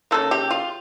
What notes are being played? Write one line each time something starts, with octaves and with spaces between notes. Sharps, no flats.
C#3 F3 A#3 A4
G4
F4